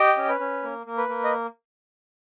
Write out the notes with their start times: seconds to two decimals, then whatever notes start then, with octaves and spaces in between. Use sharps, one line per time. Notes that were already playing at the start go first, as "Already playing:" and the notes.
Already playing: G4 D#5 G5
0.17 C#4
0.29 B4
0.40 C#4
0.63 A#3
0.86 A#3
0.98 B4
1.09 A#3
1.24 D#5